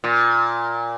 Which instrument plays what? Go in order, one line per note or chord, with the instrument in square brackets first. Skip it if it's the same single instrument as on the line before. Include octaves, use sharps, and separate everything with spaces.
[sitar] A#2